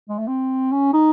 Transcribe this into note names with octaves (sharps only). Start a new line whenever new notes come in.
G#3
A3
C4
C#4
D#4